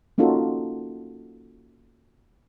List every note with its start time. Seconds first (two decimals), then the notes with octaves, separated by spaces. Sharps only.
0.18 A#3 C#4 D#4 F4 F#4 A4